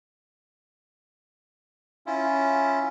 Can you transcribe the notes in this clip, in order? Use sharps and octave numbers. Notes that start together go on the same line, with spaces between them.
C#4 E4 F4